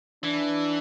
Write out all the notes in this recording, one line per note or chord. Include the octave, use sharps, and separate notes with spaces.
E3 D4